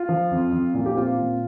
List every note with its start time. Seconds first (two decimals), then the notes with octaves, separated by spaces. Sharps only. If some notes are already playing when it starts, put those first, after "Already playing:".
Already playing: F4
0.09 F3
0.31 F2
0.52 F2
0.74 A#2 F4
0.86 G4
0.97 C4 F4
1.18 A#2